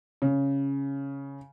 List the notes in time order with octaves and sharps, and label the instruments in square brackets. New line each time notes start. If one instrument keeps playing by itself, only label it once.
[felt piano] C#3